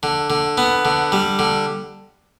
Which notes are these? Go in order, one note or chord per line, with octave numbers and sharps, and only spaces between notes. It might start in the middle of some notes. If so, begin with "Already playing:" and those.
D3
D3
B3
D3
G3
D3